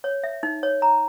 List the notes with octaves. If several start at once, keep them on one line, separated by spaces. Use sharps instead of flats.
C#5
E5
D#4
C#5
A#5